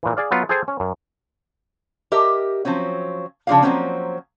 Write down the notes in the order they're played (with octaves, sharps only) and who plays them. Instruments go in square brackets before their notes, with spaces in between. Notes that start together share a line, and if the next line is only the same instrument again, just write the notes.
[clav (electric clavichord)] A#2 E3
G#4 D5 F5
F#3 B3 F4
G#4 A4 C5 G5 G#5
C#4
F#2
[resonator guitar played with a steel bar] G4 A#4 D#5 E5
F3 F#3 C4 C#4
C#3 F3 D4 G4 G#4 F5
F3 F#3 G#3 A#3 C4 C#4